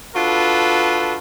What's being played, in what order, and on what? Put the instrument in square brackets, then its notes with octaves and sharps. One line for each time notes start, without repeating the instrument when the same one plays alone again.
[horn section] D4 F4 F#4 A4 B4